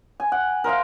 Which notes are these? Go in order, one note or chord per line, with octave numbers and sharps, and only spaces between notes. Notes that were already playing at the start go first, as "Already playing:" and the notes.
G#5
F#5
A#4 C5 E5 F5